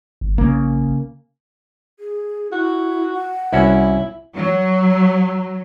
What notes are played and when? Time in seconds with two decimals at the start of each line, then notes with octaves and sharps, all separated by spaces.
0.21 G1
0.38 A#1 C#3 A#3
2.00 G#4
2.52 E4 F#4
3.14 F#5
3.53 C2 C#4 E4 F#4
4.36 F#3